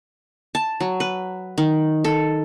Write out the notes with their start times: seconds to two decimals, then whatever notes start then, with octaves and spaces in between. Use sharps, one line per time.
0.55 A5
0.80 F#3
1.00 B4
1.58 D#3
2.04 A4